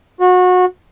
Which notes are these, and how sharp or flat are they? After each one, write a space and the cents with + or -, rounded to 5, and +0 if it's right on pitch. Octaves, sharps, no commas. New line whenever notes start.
F#4 -25